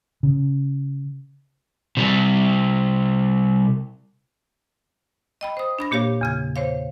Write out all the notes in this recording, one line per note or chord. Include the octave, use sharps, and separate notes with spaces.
C#3
C3 G3
D#5 G5 B5
C5 D#6
D4 B5 A#6
A#2 A#3 G4 C#5 F5
E2 C#3 G#6
C5 C#5 F5